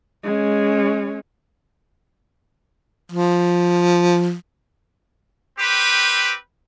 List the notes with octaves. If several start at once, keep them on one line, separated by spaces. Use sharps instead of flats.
G#3 C#4
F3
C4 G4 B4